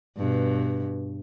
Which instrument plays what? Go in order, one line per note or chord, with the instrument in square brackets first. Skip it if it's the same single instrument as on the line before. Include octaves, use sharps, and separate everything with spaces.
[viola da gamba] G2 B2